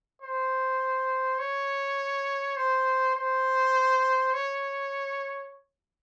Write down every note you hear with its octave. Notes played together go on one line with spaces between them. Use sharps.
C5
C#5
C5
C5
C#5